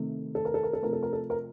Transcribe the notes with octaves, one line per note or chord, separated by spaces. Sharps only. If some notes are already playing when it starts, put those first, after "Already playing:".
Already playing: C3 D#3 A3
A4
A#4
A4
A#4
A4
C3 F3 A3 A#4
A4
A#4
A4
A#4